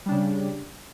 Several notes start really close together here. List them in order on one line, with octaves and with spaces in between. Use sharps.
G3 D4 C#3